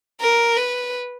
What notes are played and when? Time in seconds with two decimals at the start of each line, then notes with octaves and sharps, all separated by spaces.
0.21 A#4
0.56 B4